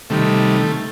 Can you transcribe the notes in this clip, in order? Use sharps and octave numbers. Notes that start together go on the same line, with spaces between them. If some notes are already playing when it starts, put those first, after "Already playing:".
C3 D#3 G3 A3